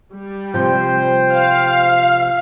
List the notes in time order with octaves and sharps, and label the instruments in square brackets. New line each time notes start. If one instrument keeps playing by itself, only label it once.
[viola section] G3
[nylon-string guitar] C3 F3 [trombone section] C5 [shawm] G5
[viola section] F5